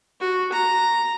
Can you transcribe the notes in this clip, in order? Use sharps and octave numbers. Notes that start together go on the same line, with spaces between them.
F#4
A#5